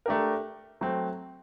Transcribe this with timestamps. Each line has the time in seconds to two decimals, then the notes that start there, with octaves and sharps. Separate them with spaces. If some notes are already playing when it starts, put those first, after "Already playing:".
0.06 A3 D4 G4 A#4
0.81 F#3 A3 C4